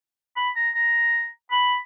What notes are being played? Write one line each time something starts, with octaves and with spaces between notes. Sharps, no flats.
B5
A#5
A#5
B5